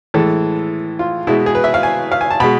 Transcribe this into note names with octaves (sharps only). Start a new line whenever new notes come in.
A2 E3 G#3 A4
F4
B2 G#3 E4
G#4
B4
E5
F5
G#5
F5
G#5
A5
B2 G#3 B5